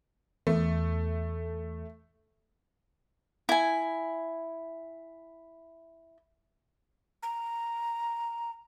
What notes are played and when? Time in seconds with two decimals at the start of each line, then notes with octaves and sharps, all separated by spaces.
0.47 E2 A3
3.49 E4 G#5
7.23 A#5